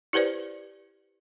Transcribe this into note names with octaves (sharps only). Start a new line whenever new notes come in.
E4 G4 B4 C5 D5